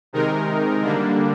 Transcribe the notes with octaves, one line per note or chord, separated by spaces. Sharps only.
C3 D#3 G#3 D#4 A#4
D3 G3 A#3 D4